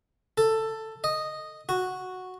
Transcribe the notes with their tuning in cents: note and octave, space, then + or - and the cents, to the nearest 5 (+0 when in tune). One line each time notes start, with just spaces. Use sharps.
A4 +10
D#5 -5
F#4 -5